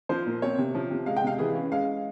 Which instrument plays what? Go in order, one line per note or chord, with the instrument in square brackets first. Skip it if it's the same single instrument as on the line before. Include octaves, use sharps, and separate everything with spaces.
[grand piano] F3 C5
A#2
C4 C#5
C3
F3
C3
G#3 F5
G5
C3 F5
E3 G#4
C#4
G#3 F5